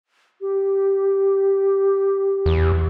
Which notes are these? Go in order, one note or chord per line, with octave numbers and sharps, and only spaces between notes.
G4
E2